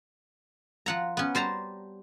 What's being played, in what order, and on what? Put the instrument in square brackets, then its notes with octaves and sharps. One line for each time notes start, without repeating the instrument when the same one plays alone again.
[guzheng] F3 F#5 A#5
B3 C#4
G3 C5 A5 A#5